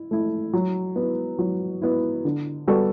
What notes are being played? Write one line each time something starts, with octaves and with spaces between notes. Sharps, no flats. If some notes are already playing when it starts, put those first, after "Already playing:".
Already playing: E4
A3 E4
F#3
B3 E4
F#3
B3 E4
D3
G3 B3 F#4 A4